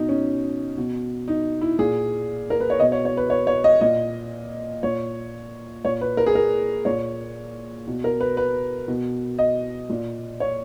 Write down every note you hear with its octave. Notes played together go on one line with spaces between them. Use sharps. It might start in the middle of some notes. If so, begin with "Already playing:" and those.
Already playing: B2 D#4
C#4
B2
D#4
E4
A#2 G#4
A#4
B4
C#5
B2 D#5
C#5
C#5
B4
C#5
C#5
D#5
A#2 D#5
A#2 C#5
A#2 C#5
B4
A#4
G#4
A#4
A#2 C#5
B2
A#4
B4
B4
B2
D#5
A#2
C#5